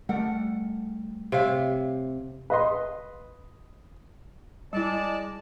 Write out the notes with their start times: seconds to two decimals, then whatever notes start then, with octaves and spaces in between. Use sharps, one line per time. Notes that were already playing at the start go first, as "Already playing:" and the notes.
0.09 G3 A3 A4 A#4 F#5
1.32 C3 C#5 E5 F5
2.50 B4 D#5 C6
4.73 G3 G#3 E4 D5 A5